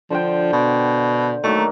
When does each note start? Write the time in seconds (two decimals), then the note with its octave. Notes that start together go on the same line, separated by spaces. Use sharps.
0.10 D3 F3 C5 G5
0.53 B2
1.43 D#3 F#3 A3 A#3